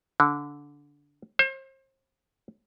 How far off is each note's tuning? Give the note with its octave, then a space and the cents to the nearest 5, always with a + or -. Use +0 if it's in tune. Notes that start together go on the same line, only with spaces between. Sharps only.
D3 -15
C5 +35